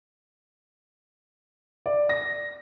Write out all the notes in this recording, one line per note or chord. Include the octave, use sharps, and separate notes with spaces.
D5
A#6